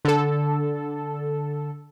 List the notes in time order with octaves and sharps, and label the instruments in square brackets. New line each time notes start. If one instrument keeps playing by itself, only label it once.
[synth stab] D3 A4